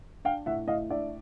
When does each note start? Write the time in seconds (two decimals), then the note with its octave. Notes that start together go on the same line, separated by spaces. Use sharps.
0.25 D4 F5 G5
0.46 A2 E5 F#5
0.68 A2 D#5 F5
0.90 D4 D5 E5